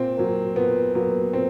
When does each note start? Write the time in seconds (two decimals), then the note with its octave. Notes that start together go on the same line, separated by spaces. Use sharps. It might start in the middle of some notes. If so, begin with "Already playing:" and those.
Already playing: A#2 C4
0.17 F#3 A#3
0.56 A#2 B3
0.95 F#3 A#3 B3
1.33 A#2 C4